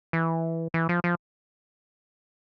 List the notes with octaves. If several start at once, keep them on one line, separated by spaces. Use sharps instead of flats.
E3
E3
F3
F3